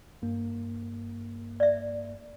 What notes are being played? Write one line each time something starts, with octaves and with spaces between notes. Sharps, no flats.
G2 A#3
D5 E5